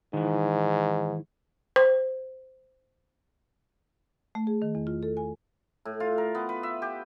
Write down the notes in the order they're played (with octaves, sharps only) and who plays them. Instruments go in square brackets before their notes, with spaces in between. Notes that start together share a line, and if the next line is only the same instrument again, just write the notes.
[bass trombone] G#2 [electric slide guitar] D#3 E3
[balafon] C5
[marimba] A3
G#4
D#3
E2
F4
A4
G#5
[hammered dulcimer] A2
F4
A#4
B3
B4
E5
G4